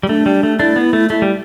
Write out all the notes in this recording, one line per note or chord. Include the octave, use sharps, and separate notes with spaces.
G3
A3 D4
G3
A3
A3 D4 E4
B3
A3
A3 E4
G3